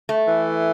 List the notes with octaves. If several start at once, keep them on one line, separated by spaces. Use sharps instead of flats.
A3
E3